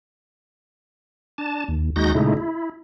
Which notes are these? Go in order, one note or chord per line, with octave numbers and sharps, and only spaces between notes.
D4 A5
D#2
D#2 G#3 D#4 F#4 G6 A#6
A#2 C#3 G#3 A3 D#4 E4
E4